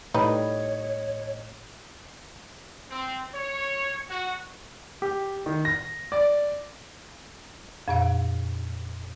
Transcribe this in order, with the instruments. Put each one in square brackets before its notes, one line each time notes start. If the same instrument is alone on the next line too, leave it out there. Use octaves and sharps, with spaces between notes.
[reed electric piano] A2 D#5 [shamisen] G3 D#4 B4 [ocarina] C#5
[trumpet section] C4
C#5
F#4
[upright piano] G4
D#3
A#6
D5
[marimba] F2 A#2 F5